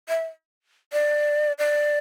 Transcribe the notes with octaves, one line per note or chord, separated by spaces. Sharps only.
E5
D5
D5